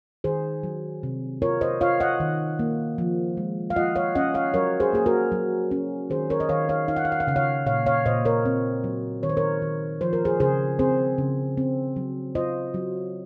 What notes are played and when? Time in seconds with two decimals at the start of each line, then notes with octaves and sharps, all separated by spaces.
0.24 D#3 G#4 C5
0.63 F#3
1.03 C3
1.42 F4 A#4 C#5
1.61 C5 D#5
1.81 F4 C#5 F5
2.00 D#5 F#5
2.20 D#3
2.59 A#3
2.98 F3
3.37 G#3
3.70 F5
3.76 F4 D#5 F#5
3.96 C#5 F5
4.15 C#4 D#5 F#5
4.34 C#5 F5
4.54 F#3 A#4 C#5
4.80 G#4 C5
4.93 A#3 G#4
5.06 F#4 A#4
5.32 F#3
5.71 C#4
6.10 D#3 G#4 C5
6.30 A#4 C#5
6.40 D#5
6.49 D#3 C#5 F5
6.69 C#5 F5
6.88 D#4 F5
6.96 F#5
7.05 F5
7.12 F#5
7.20 F5
7.27 C#3 F#5
7.36 C#5 F5
7.66 A#2 C#5 F5
7.86 C#5 F5
8.06 A#2 C5 D#5
8.25 A#4 C#5
8.45 C4
8.84 F#3
9.23 D#3 C#5
9.29 C5
9.37 A#4 C#5
9.62 D#3
10.01 F3 C5
10.13 A#4
10.25 G#4 C5
10.40 C#3 G#4 C5
10.79 C4 G#4 C5
11.18 C#3
11.57 C4
11.96 F#3
12.35 F4 C5 D#5
12.74 F#3